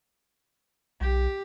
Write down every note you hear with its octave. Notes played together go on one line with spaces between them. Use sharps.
B1 G4